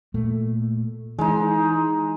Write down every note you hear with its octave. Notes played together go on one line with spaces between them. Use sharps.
A#2 A3
E3 G#3 D#4